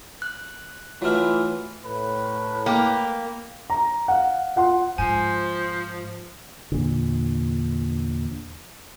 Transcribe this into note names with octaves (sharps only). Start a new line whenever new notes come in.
F#6
E3 F#3 A3 E4 F4 F6
A2 B4
A#3 G4
A#5
F5 F#5
F4 F#5 C6
G#2 F3 C5 G#5
E2 A#2 D3